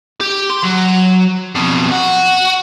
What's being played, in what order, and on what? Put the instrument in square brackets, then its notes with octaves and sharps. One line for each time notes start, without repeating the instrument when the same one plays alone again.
[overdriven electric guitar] G4
C6
F#3
F2 B2
F#4